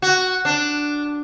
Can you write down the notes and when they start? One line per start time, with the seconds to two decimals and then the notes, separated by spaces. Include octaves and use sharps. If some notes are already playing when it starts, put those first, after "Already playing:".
0.02 F#4
0.45 D4